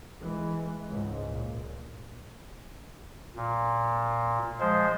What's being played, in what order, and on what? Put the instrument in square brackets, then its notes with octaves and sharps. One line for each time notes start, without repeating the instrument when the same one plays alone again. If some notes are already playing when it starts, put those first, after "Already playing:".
[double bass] E3 G#3
C#2 G#2
A#2
[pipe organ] A#2
F3 G#3 C5